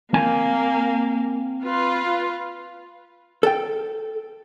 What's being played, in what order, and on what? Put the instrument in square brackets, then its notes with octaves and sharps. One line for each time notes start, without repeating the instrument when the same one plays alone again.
[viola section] A#3 [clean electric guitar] C4 G#5
[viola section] F4 B4
[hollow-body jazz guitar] A4 G5